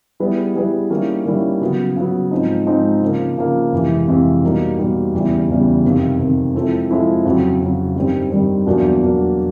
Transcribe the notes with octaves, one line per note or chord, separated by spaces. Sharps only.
G3 B3 E4 G#4 B4
G3 B3 E4 G#4 B4
D#3 G3 A#3 C#4 E4
D#3 G3 A#3 C#4 E4
C#3 F#3 B3
C#3 F#3 B3
G#2 F3 G#3 C4 D#4
G#2 F3 G#3 C4 D#4
C#3 F3 A#3
C#3 F3 A#3
F2 C3 E3 G#3
F2 C3 E3 G#3
B2 G3 A#3 D#4
B2 G3 A#3 D#4
E2 C#3 E3 G3
E2 C#3 E3 G3
F2 C3 D#3
F2 C3 D#3
F3 G#3 C4 E4 A4
F3 G#3 C4 E4 A4
F2 C#3 F#3
F2 C#3 F#3
G2 D#3 G3 C4
G2 D#3 G3 C4
E2 B2 F#3 A#3 D4
E2 B2 F#3 A#3 D4